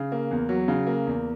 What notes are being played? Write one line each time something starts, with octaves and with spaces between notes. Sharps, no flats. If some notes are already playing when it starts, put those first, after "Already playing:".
Already playing: C#3
A#3
E2
F#3
C#3
A#3
E2